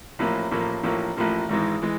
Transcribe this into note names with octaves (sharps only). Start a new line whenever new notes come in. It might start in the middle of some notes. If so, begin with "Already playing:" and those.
A1 A2 F3 A#3
A1 A2 F3 A#3
A1 A2 F3 A#3
A1 A2 F3 A#3
G#1 G#2 E3 G#3
E3 G#3